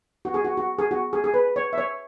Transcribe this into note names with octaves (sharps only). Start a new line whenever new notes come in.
F#4
G#4
F#4
F#4
G#4
F#4
G#4
G#4
B4
C#5
E5
C#5